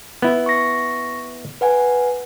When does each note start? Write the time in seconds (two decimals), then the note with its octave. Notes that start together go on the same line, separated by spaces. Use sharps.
0.22 B3 E4
0.46 C#6 A#6
1.61 B4 F#5 G#5